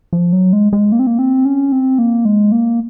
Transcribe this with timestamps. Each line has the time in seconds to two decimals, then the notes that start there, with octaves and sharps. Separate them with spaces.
0.13 F3
0.33 F#3
0.53 G#3
0.73 G#3
0.92 A#3
0.99 C4
1.07 A#3
1.19 C4
1.45 C#4
1.72 C4
1.99 A#3
2.25 G#3
2.52 A#3